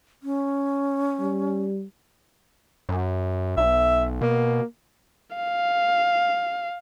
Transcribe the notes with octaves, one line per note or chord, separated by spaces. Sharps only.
C#4
G3
F#2
B1 E5
B2 A#3
F5